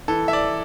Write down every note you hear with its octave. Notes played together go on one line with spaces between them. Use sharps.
E3 A4
E5
D5